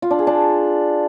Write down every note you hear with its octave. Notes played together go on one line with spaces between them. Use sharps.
F4
D4
G#4
D4